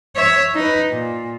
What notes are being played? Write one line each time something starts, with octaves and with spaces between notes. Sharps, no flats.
C#5 E5
D#4 B4
A#2